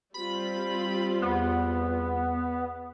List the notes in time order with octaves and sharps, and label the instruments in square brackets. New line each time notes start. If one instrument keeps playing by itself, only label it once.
[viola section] G3 C4 F4 [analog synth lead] B5
[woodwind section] E2 [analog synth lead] B3